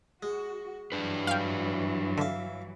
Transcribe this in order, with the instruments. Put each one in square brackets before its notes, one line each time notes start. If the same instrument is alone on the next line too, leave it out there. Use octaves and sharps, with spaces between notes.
[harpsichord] G#3 [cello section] F#4
[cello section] G2 E3 F#3 [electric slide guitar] D4 B4
[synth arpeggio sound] F5 G5
[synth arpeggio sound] D3 [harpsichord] E5 F5